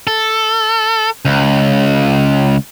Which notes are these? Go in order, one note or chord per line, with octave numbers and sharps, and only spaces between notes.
A4
C#2